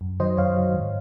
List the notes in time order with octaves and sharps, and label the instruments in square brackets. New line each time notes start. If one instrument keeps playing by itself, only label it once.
[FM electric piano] F#2
D#3 F#3 C5 D#5
F#2 C#5 F5
D#3 F#3
G#2